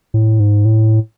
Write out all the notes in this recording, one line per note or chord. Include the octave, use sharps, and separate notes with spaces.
A2
G#2
A2